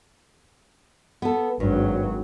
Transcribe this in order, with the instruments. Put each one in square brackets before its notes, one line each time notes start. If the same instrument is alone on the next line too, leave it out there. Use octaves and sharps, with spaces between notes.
[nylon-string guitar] B3 A4
[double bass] G#1 F#3 [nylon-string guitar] G2